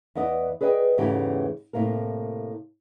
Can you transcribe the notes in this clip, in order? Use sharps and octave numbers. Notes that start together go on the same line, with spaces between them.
E2 B3 D5 D#5
G#4 B4 D5 D#5 G5
E2 G#2 C#3 E3 A3 G4
A2 C3 A#3 A#4